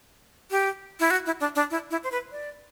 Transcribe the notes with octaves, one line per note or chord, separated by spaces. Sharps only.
G4
E4
F#4
E4
D4
D4
E4
E4
C5
B4
D5